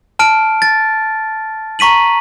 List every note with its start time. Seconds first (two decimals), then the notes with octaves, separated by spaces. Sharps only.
0.19 A5 F6 D7
0.62 A6
1.79 A#5 C#6 B6 D#7 F#7